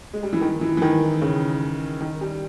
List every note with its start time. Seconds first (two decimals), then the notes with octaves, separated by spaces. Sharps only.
0.13 G#3
0.23 G3
0.33 E3
0.41 D#3
0.61 E3
0.77 E3
0.82 D#3
1.21 C#3
2.01 D#3
2.21 G3